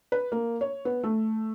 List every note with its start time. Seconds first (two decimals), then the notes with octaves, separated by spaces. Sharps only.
0.12 B4
0.32 A#3
0.61 C#5
0.85 B3
1.03 A3